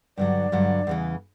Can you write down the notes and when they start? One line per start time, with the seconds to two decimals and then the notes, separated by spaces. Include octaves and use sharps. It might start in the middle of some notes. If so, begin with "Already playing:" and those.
0.17 G2 D3 F#3 D5
0.52 G2 D3 F#3
0.87 E2 C#3 E3